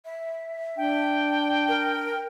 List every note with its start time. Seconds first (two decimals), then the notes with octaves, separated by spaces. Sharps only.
0.05 E5
0.77 D4 G5
1.68 A#4